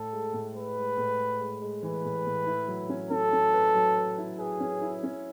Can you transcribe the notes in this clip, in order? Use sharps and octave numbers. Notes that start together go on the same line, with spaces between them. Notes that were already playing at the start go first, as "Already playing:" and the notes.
Already playing: A2 A4
G#3
A2
G#3 B4
G#3
A2
G#3
G#3
G#3
E3 B4
A2
A2
E4
F#3
C#4
C#4 A4
C#4
B4
F#3
B4
E4
G#4 B4
C#4
E4
C#4